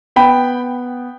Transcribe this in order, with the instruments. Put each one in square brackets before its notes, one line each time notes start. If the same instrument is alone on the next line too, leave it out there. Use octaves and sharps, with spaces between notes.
[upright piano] B3 G5 B5